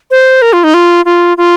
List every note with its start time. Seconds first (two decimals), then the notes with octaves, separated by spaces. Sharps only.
0.11 C5
0.42 A#4
0.53 F4
0.64 D#4
0.74 F4
1.05 F4
1.37 F4